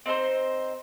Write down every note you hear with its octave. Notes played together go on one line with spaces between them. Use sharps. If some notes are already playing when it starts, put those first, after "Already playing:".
C4 D#4 A4 C5